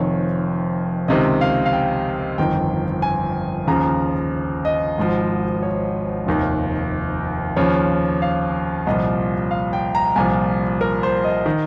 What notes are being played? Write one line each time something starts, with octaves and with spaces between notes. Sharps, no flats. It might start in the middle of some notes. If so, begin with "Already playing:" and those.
Already playing: F1 F2 D#3 C#5
C#2 C3 D#3 D#5
F5
F5
G5
G1 F2 D#3 G5
G#5
D#2 C#3 F3 A#5
D#5
G#1 G#2 F3
C#5
F1 D#2 D#3
D#2 C#3 F3 C#5
F5
C2 A#2 F3 D#5
F5
G5
A#5
C2 A#2 F3 G#5
A#4
C5
D#5
D#3